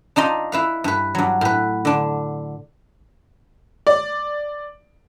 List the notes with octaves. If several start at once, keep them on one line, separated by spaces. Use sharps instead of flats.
D4 D#4 F4 D#5
E4 B4 F5
G2 B4
G2 F#3
A2 B4
D3 D4
D5